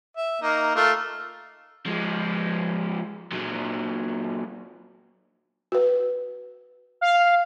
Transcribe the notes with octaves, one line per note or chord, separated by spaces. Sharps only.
E5
A#3 D#4
A3 F4 A#4
F3 G#3
A#2 F#3
F#4 B4
F5